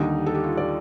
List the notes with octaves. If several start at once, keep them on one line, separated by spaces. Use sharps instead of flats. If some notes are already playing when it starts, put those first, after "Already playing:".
Already playing: D#2 D3 G3 D#4
A4
G4
F4
D5